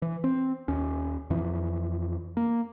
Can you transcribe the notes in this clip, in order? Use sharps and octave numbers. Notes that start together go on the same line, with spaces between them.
E3
C4
D#2 C#4
F2 E3
A#3